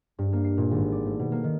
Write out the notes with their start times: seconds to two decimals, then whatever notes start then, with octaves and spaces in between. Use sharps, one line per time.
0.19 G2
0.33 A#3
0.44 C7
0.58 A#2
0.71 G#1
0.92 D5
1.06 A3
1.19 B2
1.32 A#3
1.44 D#3